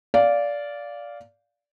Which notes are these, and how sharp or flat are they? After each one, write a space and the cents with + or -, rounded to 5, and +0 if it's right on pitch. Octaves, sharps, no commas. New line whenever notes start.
D5 -15 F5 +0